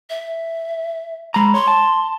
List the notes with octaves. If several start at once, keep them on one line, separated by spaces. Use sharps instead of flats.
E5
G#3 A#5 B5
C#5 C6
A5